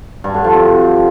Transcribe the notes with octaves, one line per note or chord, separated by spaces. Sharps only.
G2
D3
F3
C3